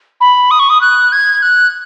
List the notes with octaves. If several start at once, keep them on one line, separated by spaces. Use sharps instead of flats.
B5
D#6
C#6
D#6
F#6
G#6
F#6